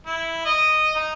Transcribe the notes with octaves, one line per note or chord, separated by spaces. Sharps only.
E4
D#5
D#4